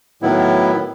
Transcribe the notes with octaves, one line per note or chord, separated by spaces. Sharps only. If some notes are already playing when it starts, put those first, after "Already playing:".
A2 D#3 F#3 B3 E4